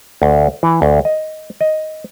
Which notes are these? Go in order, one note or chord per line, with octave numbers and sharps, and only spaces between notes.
D2
E3
D2
D#5
D#5